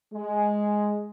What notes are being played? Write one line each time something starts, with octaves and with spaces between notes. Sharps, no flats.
G#3